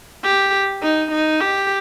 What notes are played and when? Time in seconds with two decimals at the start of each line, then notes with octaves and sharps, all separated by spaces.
0.24 G4
0.82 D#4
1.11 D#4
1.40 G4